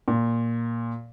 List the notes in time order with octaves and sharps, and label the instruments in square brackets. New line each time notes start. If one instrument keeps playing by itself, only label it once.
[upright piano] A#2